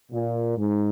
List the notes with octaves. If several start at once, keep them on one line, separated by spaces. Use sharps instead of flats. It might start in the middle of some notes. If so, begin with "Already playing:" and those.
A#2
G#2